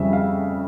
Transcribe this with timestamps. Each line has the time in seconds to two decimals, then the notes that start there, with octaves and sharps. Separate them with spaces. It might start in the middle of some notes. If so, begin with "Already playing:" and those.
Already playing: F2 C#3 G3 E5
0.13 F5